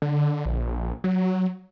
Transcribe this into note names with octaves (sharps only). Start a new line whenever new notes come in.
D3
A#1
F#3